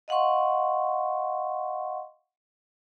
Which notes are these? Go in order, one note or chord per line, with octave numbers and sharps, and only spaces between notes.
D#5 F5 F#5 C6 C#6